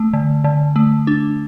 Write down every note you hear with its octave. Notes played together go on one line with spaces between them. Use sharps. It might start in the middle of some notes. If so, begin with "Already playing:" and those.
Already playing: A3
D3
D3
A3
D4